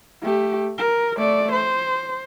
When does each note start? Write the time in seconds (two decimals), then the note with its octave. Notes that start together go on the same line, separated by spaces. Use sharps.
0.22 A3 G4
0.78 A#4
1.17 A3 D5
1.52 C5